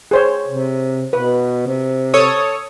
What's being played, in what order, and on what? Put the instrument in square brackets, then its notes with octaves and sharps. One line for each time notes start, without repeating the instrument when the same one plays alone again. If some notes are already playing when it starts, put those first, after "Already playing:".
[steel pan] G#4 C5 C#5
[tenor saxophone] C3
[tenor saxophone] B2 [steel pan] B4
[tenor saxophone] C3
[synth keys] A4 C#5 D#6